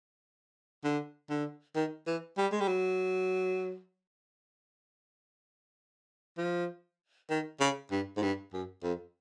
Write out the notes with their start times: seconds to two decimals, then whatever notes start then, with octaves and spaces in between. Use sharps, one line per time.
0.84 D3
1.30 D3
1.75 D#3
2.07 E3
2.37 G3
2.52 G#3
2.61 G3
2.68 F#3
6.38 F3
7.30 D#3
7.60 C#3
7.91 G2
8.17 G#2
8.22 G2
8.53 F#2
8.83 F2